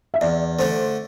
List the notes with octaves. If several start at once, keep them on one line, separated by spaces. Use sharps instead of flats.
E5
E2 D5
D3 A3 D4 C5